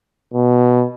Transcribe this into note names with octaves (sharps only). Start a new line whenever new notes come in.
B2